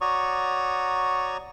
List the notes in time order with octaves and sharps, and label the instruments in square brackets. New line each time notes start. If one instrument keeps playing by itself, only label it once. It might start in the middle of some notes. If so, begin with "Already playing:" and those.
[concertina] F#4 C#5 D5 A#5 C#6 D#6